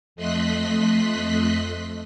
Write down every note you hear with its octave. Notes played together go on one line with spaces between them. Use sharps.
F2 A3 D#5 C6 F#6 B6